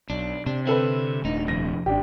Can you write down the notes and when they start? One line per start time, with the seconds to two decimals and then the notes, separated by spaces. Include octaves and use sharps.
0.10 B1 D4
0.46 C3 D4
0.67 D3 C4 E4 A4 B4
1.25 D#1 A3 D4 D#4
1.48 F2 C3 A#6
1.86 G#1 D4 G4